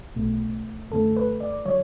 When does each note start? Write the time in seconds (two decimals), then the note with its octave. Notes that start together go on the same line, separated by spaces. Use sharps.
0.16 B1 B2 A3
0.91 F#2 D3 A3 A4
1.17 B4
1.40 D5
1.65 D3 F#3 C#5